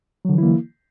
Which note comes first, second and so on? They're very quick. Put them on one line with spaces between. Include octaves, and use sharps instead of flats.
F#3 D3 E3 E4 A#3